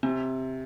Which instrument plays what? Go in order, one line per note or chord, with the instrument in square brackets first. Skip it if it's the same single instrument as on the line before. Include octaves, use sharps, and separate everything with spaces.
[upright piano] C3 [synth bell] C4